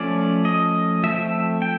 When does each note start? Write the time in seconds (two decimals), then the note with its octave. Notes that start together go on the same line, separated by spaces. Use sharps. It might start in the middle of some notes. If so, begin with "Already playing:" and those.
Already playing: F3 A3 C#4 D5
0.45 D#5
1.03 F3 A3 C4 E5
1.62 G5